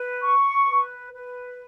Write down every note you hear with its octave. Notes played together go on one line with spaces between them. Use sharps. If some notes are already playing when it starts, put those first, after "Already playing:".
Already playing: B4
C#6
B4
B4